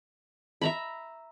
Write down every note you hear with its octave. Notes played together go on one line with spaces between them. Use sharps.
E5 A#5 B5